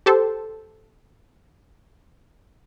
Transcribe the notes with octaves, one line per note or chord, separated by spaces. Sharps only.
G4 A4 C5